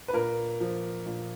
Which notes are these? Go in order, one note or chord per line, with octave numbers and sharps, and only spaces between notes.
B4
A#2 A#4
F3
A#2